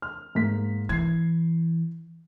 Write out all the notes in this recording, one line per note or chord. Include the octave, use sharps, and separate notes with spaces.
F6
G#2 A#3 B6
E3 G#6 C7